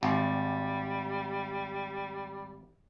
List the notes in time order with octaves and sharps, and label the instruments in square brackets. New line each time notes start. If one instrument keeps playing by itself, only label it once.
[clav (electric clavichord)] G#1 [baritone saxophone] G3